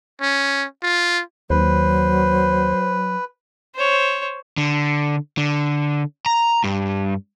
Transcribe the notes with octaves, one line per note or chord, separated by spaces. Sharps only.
C#4
F4
D#2 F#3 B4 C5
C5 C#5
D3
D3
A#5
G2